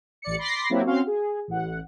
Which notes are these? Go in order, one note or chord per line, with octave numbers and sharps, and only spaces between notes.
A1 D5 C#7
B5 C6 D6 A6 A#6 C7
F#3 A#3 C4 E4 F#4 G4
C4 C#4 F#4 F5 C6
G#4
A1 F#5